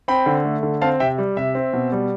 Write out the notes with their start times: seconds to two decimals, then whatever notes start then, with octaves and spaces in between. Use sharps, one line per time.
0.08 C4 G5 B5
0.26 D3
0.45 A3
0.63 D3
0.81 C4 F5 A5
1.00 C3 E5 G5
1.18 G3
1.37 C3 E5
1.55 C4
1.73 B2
1.92 G3